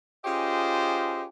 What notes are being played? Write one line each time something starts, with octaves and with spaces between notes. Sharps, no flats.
C#4 F4 G4 G#4 C5 D#5